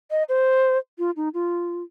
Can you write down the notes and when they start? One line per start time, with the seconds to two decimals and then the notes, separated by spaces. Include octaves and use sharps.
0.11 D#5
0.29 C5
0.99 F4
1.17 D#4
1.34 F4